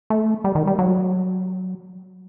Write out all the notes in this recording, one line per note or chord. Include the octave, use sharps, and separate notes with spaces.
A3
G3
D#3
G3
F#3